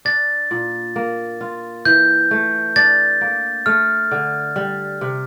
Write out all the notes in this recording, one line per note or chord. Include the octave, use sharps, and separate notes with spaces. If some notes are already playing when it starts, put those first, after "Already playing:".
D4 A6
A#2
A#3
F4
E3 G6
A3
D4 A6
A#3
A3 F6
D3
G3
C3